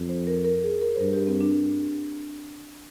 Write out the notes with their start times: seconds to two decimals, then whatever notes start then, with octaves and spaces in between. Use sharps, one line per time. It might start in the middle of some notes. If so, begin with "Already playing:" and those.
Already playing: F2
0.09 C5
0.27 A#4
0.45 A#4
0.64 G#4
0.81 A#4
0.96 C5
0.99 G2 A#4
1.13 G4
1.27 C4
1.41 D4